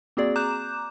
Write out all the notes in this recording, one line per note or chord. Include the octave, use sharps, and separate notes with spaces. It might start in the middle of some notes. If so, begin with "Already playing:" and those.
A#3 C4 F#4 G#4 D5
A#5 D6 F#6 G6 E7